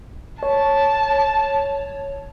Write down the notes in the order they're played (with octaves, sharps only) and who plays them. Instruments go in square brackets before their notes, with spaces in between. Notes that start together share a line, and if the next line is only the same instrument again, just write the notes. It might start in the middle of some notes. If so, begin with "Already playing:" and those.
[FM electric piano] C#5 [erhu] A5